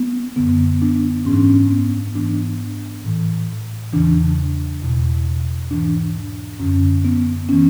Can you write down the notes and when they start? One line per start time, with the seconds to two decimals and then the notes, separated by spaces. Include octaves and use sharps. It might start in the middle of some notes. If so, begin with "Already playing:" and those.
Already playing: B3
0.36 F#2 D3 B3
0.82 D4
1.25 G#2 E3 C#4
1.34 D4
1.42 C#4
1.71 B3
2.15 G#2 E3 D4
3.04 A2 E3
3.93 E2 C#3 E3 D4
4.82 E2 B2
5.71 G#2 E3 D4
6.60 F#2 D3 C#4
7.05 B3
7.49 E3 C#4